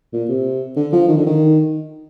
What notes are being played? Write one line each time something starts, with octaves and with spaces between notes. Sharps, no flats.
A#2
C3
D3
F3
D#3
D3
D#3